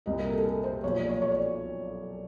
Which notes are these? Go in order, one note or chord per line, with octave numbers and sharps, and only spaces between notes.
C2 A#2 G3 D#5
A#4
A4
G#4
A4
C5
B1 A#2 F3 C#5
D5
C#5
C#5
D5